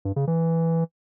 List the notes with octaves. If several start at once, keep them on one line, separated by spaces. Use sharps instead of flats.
G2
C#3
E3